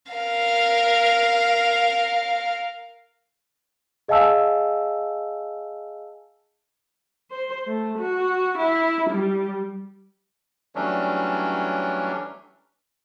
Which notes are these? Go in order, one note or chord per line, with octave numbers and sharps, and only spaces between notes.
A#4 F5
G#4 D#5 F5 G#5 A5 E6
C5
A3
F#4
E4
G3
E3 F#3 G3 A3 C#4 D4